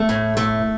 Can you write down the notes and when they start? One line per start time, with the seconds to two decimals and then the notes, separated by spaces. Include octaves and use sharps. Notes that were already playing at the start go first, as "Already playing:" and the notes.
Already playing: A3
0.09 A2
0.37 A3